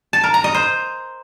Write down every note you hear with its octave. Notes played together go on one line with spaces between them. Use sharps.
A5
A#4
A#5
D#5
C5